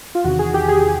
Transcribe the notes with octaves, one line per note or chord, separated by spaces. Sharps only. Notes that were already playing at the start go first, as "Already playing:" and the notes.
F4
E2 C3 D#3 F#4
G#4
G4
G#4